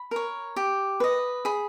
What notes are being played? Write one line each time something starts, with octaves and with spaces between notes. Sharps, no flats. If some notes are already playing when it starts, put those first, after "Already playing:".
Already playing: B5
A#4 C#5
G4
B4 D#5
G#4 B5